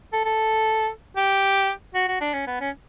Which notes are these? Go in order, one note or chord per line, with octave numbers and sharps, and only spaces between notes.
A4
A4
G4
F#4
F#4
D4
C#4
B3
C#4